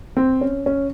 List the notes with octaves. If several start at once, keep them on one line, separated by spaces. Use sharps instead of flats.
C4
C#4
C#4